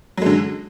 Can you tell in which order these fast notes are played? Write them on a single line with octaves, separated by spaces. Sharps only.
F#3 G#3 D3